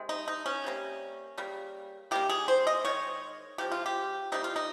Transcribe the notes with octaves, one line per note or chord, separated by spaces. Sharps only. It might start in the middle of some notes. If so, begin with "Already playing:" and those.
Already playing: C3 D#3 G#3
D#4
D#4
C#4
C3 G3 A#3
C#3 G3 A#3
D#3 G3 A#3 G4
G#4
C5
D#5
D#3 G#3 C#5
C#3 F3 G#3 G4
F4
G4
C3 G3 A#3 D#4
F4
D#4